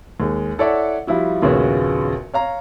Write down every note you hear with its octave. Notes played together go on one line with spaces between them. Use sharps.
D#2 G#3
E4 A4 C#5 D5 E5 F#5
F3 G3 E4 F#4
A#1 D#2 C#3 B3 F#4 C#5
C#5 F5 A#5